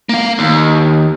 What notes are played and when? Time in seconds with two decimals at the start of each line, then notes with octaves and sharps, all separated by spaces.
0.09 A#3 F5
0.39 D#2